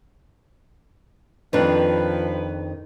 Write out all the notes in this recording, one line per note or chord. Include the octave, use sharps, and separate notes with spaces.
F2 D#3 F3 D4 B4